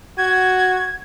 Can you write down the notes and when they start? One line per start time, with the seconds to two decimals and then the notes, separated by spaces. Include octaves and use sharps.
0.18 F#4 G#6